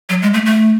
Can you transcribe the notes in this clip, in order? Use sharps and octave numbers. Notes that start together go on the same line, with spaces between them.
F#3
G#3
A3
A3